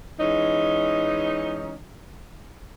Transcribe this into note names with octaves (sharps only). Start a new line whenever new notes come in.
E3 G#3 C#4 D#4